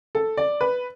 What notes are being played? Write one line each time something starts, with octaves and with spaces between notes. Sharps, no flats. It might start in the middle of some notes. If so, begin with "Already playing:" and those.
A4
D5
B4